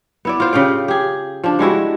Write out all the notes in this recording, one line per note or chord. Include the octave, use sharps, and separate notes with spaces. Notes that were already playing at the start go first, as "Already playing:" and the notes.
B3 E4 D5
F4 C5
C#3 G4 F5 G5
G4 G#4
F3 D4
G3 G#3 E4 F#4